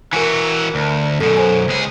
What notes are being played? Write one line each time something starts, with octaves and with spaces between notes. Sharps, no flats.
E3 F#4 A#4 G#5
D2
F#2 B2 A4
C5 G#5
C#2 G#4